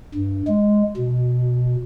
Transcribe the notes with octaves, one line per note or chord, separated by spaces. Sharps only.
G2
G#3
B2